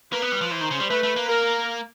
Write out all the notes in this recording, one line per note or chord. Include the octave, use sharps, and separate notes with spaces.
A#3 B4
B3
G3
F3
E3 C5
D#3
C#3
G3
A3 B4
A3
A#3
A#4